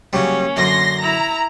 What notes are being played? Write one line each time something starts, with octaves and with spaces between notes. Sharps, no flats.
C#3 F#3 G3 A#3 C#4
F#2 D3 F#3 C6 A#6
E4 A#5